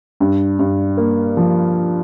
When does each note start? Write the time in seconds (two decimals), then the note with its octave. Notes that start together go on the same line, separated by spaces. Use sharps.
0.20 G2
0.59 G2
0.97 A#3
1.37 F3